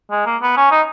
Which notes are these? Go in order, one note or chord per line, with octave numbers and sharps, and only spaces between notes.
G#3
A#3
B3
C#4
D#4